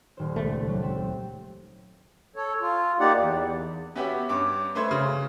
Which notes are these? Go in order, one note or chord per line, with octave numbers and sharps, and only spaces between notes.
D#1 C5
C#2 A3
F#3 G4
C4
A4 C#5
F4
A#3 D#4 G4 D5 F#5
E2
B3 C#4 F#4 G4 E5
G2 C#4 D6
A3 B4 C5 E5 G#6
C#3